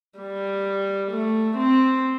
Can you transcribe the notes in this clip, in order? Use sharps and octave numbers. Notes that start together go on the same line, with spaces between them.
G3
A3
C4